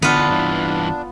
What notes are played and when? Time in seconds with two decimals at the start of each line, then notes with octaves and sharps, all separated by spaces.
0.02 D3 E3 B3 D4 F4
0.29 G2 E3